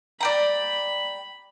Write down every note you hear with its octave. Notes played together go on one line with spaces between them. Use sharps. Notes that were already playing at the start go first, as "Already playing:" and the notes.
D5 G5 A#5 B5